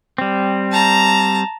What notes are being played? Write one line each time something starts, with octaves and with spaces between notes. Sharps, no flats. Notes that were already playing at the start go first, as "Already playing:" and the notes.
G3 C4
A5 A#5